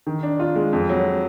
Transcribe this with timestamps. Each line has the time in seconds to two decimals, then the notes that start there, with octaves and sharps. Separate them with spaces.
0.07 D#3
0.23 D4
0.40 F4
0.55 G#3
0.73 F2
0.89 F#3